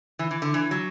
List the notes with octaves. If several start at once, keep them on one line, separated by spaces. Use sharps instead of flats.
E3
E3
D3
E3
F#3